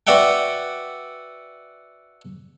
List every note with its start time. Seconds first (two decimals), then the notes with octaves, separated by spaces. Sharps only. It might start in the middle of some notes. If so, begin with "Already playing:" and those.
0.07 F#4 B4 D5 E5 F#5 G5